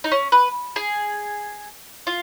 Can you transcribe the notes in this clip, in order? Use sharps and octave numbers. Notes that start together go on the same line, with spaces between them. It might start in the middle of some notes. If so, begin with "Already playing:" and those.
D#4
C#4
B4
G#4
F4